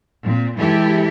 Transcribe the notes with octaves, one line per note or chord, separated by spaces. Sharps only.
A#2 C4
E3 G#3 E4 G4 A4